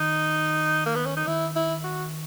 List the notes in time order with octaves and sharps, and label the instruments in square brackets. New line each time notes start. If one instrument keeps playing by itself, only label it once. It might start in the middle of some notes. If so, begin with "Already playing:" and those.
Already playing: [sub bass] D#3 [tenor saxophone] D#4
[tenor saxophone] A#3
B3
C#4
D#4
[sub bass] D#3 [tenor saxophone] E4
[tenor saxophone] E4
F#4